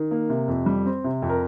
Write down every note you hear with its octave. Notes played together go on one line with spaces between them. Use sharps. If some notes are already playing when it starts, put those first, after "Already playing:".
Already playing: D#3
A#3
C3
F2
G3
C4
C3
F2
A#4